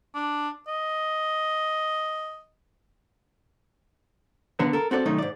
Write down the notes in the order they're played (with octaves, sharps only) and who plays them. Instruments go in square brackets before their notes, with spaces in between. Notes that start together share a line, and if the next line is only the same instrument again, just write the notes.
[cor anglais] D4
D#5
[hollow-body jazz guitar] D3 A#3 B3
A4 A#4
C4 F#4 A4 D5
C2 F#2 D#3 A3 D#4
G#2 D5